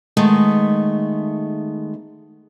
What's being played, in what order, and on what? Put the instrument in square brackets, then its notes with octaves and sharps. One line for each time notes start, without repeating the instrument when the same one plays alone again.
[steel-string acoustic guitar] D#3 G#3 A3 B3